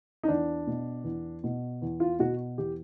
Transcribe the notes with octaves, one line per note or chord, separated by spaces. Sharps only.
D#4
E2 D4
B2
E2
B2
E2
F4
B2 F#4
E2 G4